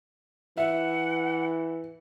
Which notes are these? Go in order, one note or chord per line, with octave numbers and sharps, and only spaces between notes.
E3 E5 F#5